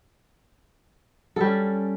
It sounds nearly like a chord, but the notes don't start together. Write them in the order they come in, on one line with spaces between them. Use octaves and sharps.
A4 G3 C#4